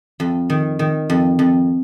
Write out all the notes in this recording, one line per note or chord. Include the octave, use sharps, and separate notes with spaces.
F2
D#3
D#3
F2
F2